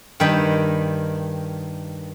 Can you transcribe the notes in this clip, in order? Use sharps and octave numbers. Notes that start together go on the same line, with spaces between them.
G2 D#3 A#4 E5 G5 B5